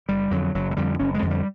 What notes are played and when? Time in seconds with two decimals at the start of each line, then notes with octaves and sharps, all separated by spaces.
0.08 F#1 G3
0.31 F2 D3 F#3
0.55 F#1 F#3
0.71 F#3
0.77 F2 D3 G3
0.99 F#1 C#4
1.14 G#3
1.22 F2 D3
1.31 G3